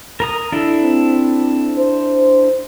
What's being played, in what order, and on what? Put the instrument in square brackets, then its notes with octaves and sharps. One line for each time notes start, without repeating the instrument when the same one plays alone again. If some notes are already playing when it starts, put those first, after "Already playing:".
[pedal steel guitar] A#4 A#5 D#6
D4 E4 A4
[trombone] C4
C5